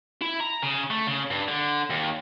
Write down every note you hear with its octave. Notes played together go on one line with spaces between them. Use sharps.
E4
A#5
C#3
A3
C#3
G2
D3
D#2